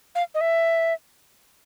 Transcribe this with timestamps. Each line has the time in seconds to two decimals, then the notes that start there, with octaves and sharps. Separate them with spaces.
0.15 F5
0.35 D#5
0.41 E5